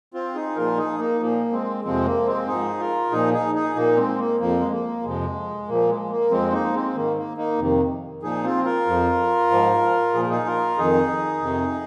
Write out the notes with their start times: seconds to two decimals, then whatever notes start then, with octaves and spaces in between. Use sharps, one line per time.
0.14 C4 F4
0.35 D#4 G#4
0.56 A#2 F3 F4 A#4
0.77 D#4 G#4
0.98 A#3 D#4
1.20 A#2 F3 A#3
1.52 G#3 C4
1.84 F2 C3 F3 G#3 C4
2.05 A#3
2.26 G#3 C4
2.47 G#2 F3 D#4 G#4
2.80 F4 A#4
3.11 A#2 F3 D#4 G#4
3.33 D#4 G#4
3.55 D#4 G#4
3.75 A#2 F3 A#3 D#4
3.97 G#3 C4
4.18 A#3
4.39 F2 F3 A#3
4.60 G#3
4.71 A#3
5.03 F2 C3 F3 G#3
5.68 A#2 F3 A#3
5.89 G#3
6.10 A#3
6.31 F2 F3 G#3 C4
6.52 A#3 D#4
6.74 G#3 C4
6.95 G#2 D#3 A#3
7.17 A#3
7.37 A#3 D#4
7.58 F2 C3 D#3
8.23 A#2 F3 D#4 G#4
8.44 C4 F4
8.65 F4 A#4
8.87 F2 F3
9.51 G#2 F3
10.14 A#2 F3 G#4
10.22 A#4
10.30 D#4 G#4
10.46 F4 A#4
10.78 F2 D#3 D#4 G#4
11.42 F2 C3 D#3